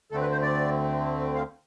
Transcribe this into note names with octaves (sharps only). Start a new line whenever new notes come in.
D2 D3 A3 C4 A4
B4
C5
D5
F5